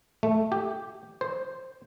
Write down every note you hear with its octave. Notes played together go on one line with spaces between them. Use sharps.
A3
G4
C5